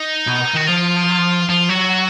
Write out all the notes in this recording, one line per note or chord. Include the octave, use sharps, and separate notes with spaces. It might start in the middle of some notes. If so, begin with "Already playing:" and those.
Already playing: D#4
B2
D#3 F#4
F3 F4
F3 F4
F#3 F#4